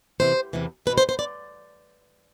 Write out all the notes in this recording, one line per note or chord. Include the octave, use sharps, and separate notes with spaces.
E2 C3 E3 C5
E2 C3 E3
E2 B2 B4
C5
C5
D5